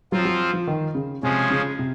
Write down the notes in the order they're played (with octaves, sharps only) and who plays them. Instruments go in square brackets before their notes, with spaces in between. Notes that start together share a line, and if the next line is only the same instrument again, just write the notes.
[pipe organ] F3 C4 F4 [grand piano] F#3
[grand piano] F#3
F3
D#3
C#3
[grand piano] C3 [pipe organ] F3 G#3 C#4 G#4
[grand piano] C#3
C3